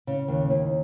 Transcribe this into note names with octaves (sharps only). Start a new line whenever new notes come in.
C#3
D#2
D#2